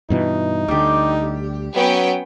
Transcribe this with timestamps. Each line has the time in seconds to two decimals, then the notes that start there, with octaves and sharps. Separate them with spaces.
0.10 G2 B2 E3 D#4
0.68 D2 D3 G3 G4
1.76 F#3 B3 C#4 G5